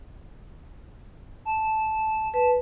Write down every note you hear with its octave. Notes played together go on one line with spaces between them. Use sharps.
A5
B4 A5